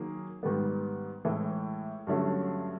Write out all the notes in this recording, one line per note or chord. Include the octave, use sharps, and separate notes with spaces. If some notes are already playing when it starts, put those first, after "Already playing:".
Already playing: D#3 F#3 A#3 D#4 G#4
G#2 D#3 G3 B3
A2 E3 G#3
G2 D3 F#3 A3 C#4